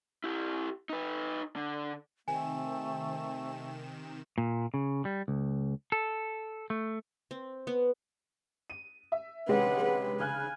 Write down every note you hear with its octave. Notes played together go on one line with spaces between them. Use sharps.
E4 G4
D#4 B4
D3
C3 D#3 A3 C4 G#5 E7
A#2
C#3
G3
C#2
A4
A3
C4
B3
D#7
E5
C3 G#3 C#4 B4 F#5
B4
C#3 G#5 F6 F#6